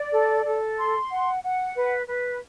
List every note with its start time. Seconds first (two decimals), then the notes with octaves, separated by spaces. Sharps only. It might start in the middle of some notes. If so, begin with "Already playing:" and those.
Already playing: D5
0.11 A4
0.45 A4
0.78 C6
1.10 F#5
1.43 F#5
1.75 B4
2.08 B4